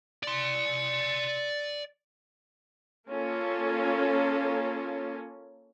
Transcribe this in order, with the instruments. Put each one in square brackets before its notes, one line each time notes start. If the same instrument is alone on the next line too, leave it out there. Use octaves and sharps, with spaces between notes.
[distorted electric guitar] D5 C6
[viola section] A#3 C#4 F4 A4